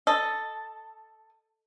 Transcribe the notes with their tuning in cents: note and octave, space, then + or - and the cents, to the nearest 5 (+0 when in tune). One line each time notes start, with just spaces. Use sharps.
A4 +0 D#5 +0